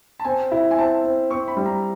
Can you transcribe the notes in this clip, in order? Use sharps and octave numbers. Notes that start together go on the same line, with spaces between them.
A5
C4 G#5
E4
G#5
C4 A5
C4
C4 C#6
B5
G3
A#5